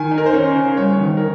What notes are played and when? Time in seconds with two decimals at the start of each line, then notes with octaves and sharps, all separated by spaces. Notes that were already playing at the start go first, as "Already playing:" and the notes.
Already playing: D#3 G#5
0.11 D#4
0.18 A#4
0.26 C5
0.33 C#4 C#5
0.56 C#3
0.77 G2 C#5
1.00 D#3
1.17 A#4